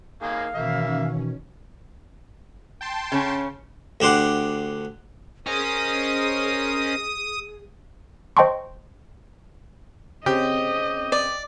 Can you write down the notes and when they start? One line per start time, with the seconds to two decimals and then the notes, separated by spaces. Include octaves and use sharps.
0.22 D#3 A#3 G#4 F5
0.55 B2 D#3 E3 A#3 C#4 E5
2.81 G5 A5 C6
3.12 C#3 C#4
4.00 D2 D4 G4 C5 F#5
5.47 C#4 G#4 A#4 C5 D#5 G#5 D#6
8.37 C5 D#5 G5 A5 C6 C#6
10.26 C#3 C4 C#4 G4 D#5
11.12 D5